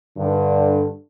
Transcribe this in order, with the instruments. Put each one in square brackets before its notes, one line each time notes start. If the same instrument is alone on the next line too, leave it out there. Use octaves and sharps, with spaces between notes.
[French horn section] G2 D3